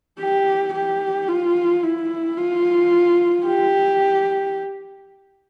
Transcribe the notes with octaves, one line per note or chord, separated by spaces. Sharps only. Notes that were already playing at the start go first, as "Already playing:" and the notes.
G4
G4
F4
E4
F4
G4